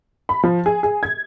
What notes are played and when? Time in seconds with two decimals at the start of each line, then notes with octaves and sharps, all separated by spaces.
0.29 B5
0.43 F3
0.66 G#4
0.83 G#4
1.03 G#6